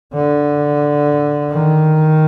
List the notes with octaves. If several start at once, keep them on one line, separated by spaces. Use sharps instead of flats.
D3
D#3